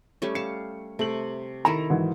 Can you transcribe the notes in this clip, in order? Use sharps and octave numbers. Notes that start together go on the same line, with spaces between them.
G3 A3 C#4
F5 A5 C#7
C3 A3 F#7
D#3 E4 A4 A#5 B5
G#2 E3 F#3